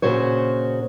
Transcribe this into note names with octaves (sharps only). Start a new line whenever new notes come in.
A#2 C#3 F#4 C5 C#5